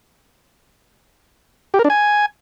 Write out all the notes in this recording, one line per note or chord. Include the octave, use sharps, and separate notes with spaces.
G4
A#4
D4
G#5